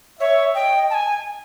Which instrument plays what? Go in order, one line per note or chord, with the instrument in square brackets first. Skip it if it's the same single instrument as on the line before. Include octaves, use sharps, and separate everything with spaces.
[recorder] C#5 [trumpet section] E5
[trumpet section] D#5 [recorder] G5
[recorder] A5
G#5